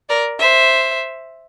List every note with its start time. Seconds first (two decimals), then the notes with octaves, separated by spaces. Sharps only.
0.09 A#4 D5
0.39 C5 E5